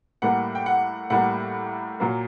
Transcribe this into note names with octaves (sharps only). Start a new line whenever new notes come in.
A2 G3 A#3 F#5
G5
F#5
A2 G3 A#3 F#5
A#2 F#3 A#3